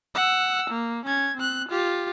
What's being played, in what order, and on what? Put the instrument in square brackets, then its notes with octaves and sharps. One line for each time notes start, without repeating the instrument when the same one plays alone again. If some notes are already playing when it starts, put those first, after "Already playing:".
[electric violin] F#5 E6
A#3
C#4 G#6
C4 F#6
F4 G4